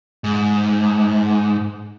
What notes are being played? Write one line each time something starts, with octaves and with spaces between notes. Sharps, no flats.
G#2